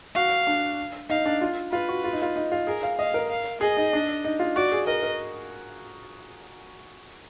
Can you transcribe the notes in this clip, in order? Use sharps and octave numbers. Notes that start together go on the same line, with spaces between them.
F#4 F5
D4
D#4 F5
D4
F4
F4 B4
F#4
F4
D#4
F4
D#4
F4
G#4 A#4
F5
D#5 F5
A#4
F5
G#4 D#5
D#4
D4
D#4
F4
F#4 D5
G#4
A#4 D#5
A#4